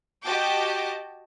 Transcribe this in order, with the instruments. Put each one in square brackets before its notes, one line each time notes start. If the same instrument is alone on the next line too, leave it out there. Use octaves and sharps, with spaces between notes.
[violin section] F#4 G4 D#5 G5 A5 D6